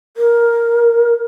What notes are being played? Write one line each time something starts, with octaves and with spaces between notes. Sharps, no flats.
A#4